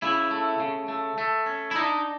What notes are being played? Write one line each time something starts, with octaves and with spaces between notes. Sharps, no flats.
C#3 E4
A3
C#3
A3
A3
C#4
E4
D4 D#4